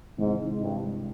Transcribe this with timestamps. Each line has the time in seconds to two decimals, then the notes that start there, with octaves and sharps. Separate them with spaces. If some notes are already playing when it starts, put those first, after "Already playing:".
0.18 G#2 C3 D#3 G#3 C4 E4
0.60 G2